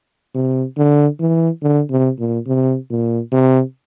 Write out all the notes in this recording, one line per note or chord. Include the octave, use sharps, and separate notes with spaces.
C3
D3
E3
D3
C3
A#2
C3
A#2
C3